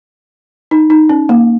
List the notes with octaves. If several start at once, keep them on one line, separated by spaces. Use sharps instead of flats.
D#4
D#4
C#4
A#3